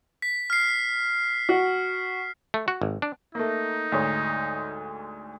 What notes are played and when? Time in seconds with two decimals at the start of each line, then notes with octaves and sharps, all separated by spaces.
0.22 B6
0.50 F6 C7
1.49 F#4
2.54 A3
2.68 F#4
2.82 G#1
3.02 D4
3.35 A3 A#3 D#4
3.92 D2 G#2 C#5